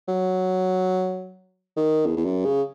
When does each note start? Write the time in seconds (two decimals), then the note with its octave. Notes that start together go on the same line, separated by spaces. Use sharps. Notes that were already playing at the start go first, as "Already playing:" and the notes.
0.08 F#3
1.77 D#3
2.06 E2
2.17 E2
2.25 F#2
2.45 C#3